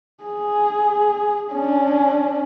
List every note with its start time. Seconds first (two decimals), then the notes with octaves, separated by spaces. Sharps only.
0.23 G#4
1.52 C#4 D4